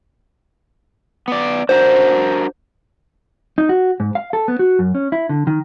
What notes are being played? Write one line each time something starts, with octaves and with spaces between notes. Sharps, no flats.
B3 D5
D4 F#4 A#4 C5
D#4
F#4
G#2
F5
A4
B3
F#4
F#2
C#4
E4
D3
D#3